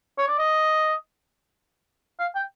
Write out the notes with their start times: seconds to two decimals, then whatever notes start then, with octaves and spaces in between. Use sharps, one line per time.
0.18 C#5
0.28 D5
0.39 D#5
2.19 F5
2.35 G5